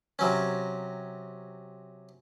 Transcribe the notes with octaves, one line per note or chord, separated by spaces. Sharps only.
C3 F#3 C#4